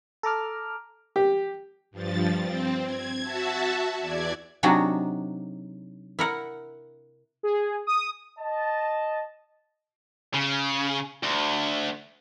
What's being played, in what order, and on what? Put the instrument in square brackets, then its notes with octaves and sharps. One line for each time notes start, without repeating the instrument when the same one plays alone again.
[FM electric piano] A4 A#5 D6 F6
[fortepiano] G4
[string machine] G2 F3 A6
C4
G#6
F#4 E5 A5
E2 D5 G#6
[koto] C3 F#3 D4 D#4 F#4 G#4
E4 A#4 F#5
[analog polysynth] G#4
D#6
[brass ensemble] D#5 A5
[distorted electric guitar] C#3
D2